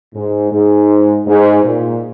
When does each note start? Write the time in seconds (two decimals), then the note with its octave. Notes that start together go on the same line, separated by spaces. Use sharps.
0.14 G#2
0.52 G#2
1.26 G#2
1.64 A#2